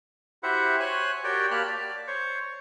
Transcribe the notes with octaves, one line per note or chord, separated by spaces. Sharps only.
E4 F#4 G4 C5 E5 F#5
C5 C#5 G#5 F#6
F#4 G4 A#4 C#5 D5 G5
A#3 G4 A5 B5 F6 F#6
D5
C5 C#5